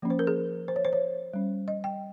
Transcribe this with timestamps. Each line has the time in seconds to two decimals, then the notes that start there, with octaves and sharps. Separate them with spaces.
0.02 F3 A#3 C#4
0.10 C5
0.19 A#4
0.27 G#4
0.68 C5
0.76 C#5
0.85 C5
0.93 C#5
1.34 G3 C#4
1.68 D#5
1.84 G5